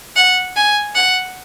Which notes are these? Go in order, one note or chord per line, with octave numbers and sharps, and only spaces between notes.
F#5
G#5
F#5